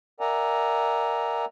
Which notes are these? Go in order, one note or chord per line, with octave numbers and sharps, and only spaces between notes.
A#4 D5 E5 F#5 G#5 A#5